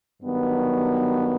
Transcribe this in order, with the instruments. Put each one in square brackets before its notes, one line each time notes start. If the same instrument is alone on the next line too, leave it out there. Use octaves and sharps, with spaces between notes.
[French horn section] G2 D#3 F#3 B3